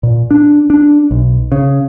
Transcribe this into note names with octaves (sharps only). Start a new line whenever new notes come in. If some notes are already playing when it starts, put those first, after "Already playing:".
A#2
D4
D4
B1
C#3